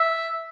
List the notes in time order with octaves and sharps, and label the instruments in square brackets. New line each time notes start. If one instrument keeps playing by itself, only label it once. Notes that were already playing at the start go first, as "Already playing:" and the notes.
Already playing: [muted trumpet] E5